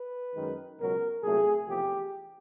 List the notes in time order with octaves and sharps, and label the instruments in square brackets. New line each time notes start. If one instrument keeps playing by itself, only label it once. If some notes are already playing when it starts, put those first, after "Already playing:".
Already playing: [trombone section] B4
F#2 D#3 G#3
C#2 B2 F#3 A#4
C2 A#2 F#3 A3 G#4
E2 C3 F3 A3 G4